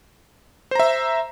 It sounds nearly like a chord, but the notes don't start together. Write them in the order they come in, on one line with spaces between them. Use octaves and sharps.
C5 A#5 E5